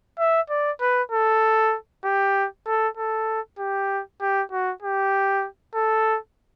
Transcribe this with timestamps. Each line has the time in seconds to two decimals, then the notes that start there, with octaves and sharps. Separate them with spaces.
0.19 E5
0.50 D5
0.81 B4
1.12 A4
2.04 G4
2.67 A4
2.97 A4
3.59 G4
4.21 G4
4.52 F#4
4.82 G4
5.75 A4